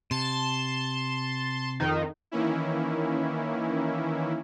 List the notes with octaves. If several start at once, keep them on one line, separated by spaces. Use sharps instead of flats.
C3 A5 C6
F2 D#3 D#4
D#3 E3 A#3 C#4 E4